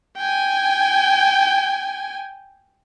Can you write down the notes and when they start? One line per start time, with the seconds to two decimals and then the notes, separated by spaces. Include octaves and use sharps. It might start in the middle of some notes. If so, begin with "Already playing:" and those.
0.17 G5 G#5